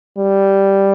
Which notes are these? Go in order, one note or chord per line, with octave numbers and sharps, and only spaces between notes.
G3